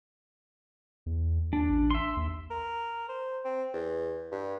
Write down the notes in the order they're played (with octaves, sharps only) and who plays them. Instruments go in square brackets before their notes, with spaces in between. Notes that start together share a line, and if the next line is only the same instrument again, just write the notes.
[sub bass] E2
[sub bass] D#2 [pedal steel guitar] D4
[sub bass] A1
[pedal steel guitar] E5 C6
[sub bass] D#2
[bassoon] A#4
C5
C4
E2
G2